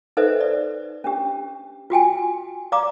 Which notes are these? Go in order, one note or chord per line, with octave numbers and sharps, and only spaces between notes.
D#4 A4 B4 C5 D#5 E5
D5
C#4 D4 G4
F4 F#4 G5 G#5
D5 F5 A#5 D6 D#6